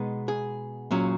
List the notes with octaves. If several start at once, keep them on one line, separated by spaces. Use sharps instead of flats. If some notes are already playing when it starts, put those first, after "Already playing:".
Already playing: B2 G#3 B3 D#4
G#4
A#2 F#3 C#4